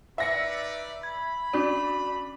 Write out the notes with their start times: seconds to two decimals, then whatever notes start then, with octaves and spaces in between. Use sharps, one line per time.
0.18 D#4 B4 D5 E5 A#6 C#7
1.03 B5 G#6
1.53 C#4 D4 F#4 D5